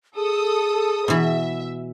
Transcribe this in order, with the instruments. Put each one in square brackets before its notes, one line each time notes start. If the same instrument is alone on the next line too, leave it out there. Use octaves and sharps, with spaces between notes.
[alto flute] G#4 [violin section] A4 D#6
[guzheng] B2 E3 [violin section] E5